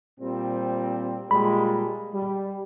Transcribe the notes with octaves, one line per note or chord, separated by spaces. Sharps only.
A#2 G3 C4
A#2 G3 G#3 B5
G3